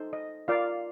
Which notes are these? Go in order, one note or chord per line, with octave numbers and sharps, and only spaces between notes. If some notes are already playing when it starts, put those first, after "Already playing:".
Already playing: D#4 A4 C5
D#5
F4 A#4 D5 F5